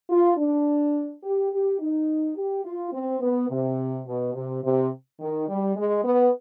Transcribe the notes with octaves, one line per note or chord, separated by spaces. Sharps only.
F4
D4
G4
G4
D#4
G4
F4
C4
B3
C3
B2
C3
C3
D#3
G3
G#3
B3